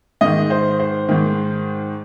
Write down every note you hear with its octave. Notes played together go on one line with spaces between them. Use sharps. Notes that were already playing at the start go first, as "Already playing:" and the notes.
G#2 D#3 D#5
C5
C5
G#2 D#3